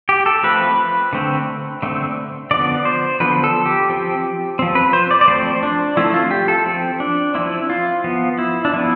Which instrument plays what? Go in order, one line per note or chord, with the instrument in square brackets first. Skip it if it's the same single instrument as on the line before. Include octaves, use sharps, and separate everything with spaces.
[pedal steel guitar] G4
A4
F3 A3 C4 B4
D3 A3 C4
D3 A3 C4
D3 F3 B3 D5
C5
D3 F3 B3 B4
A4
G4
F3 C4
F3 C4
B4
C5
D5
D5
F3 A3 C4 C5
D4
F3 A3 C4 E4
F4
G4
A4
F3 C4
D4
F3 C4 E4
F4
F3 B3
E4
D4
F3 B3 E4